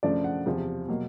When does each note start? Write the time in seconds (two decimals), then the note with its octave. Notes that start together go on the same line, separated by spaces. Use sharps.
0.03 F#2 C#3 F3 A3 D4 D5
0.24 F#5
0.46 E2 C3 F3
0.88 B2 F#3 A#3